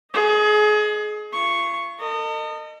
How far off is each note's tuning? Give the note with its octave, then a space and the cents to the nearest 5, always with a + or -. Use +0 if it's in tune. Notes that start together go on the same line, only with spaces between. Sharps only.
G#4 +30 D#5 +0
F4 -40 C#6 +0
A4 +45 D#5 -20